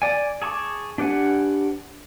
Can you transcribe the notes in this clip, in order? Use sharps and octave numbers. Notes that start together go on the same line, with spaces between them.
D5 G#5
G#4 A5 C#6 D6
D4 G4 B4 F#5 G#5